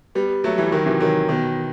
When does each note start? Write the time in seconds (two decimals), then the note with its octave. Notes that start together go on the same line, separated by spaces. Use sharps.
0.15 G3 B3
0.44 F#3 A3
0.58 E3 G3
0.72 D#3 F#3
0.86 C3 E3
1.00 D#3 F#3
1.29 B2 D#3